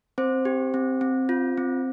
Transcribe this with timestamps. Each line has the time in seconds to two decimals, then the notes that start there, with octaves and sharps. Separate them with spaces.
0.18 C4 C5
0.45 G4
0.74 C4
1.01 C4
1.29 F4
1.58 C4